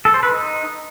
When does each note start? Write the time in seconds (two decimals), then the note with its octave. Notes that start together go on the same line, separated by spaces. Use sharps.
0.05 A4
0.14 C5
0.23 B4
0.32 D#4